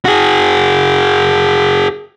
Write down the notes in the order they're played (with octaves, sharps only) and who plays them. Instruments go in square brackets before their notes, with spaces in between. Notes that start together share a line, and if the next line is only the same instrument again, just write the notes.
[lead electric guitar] F#4 G#4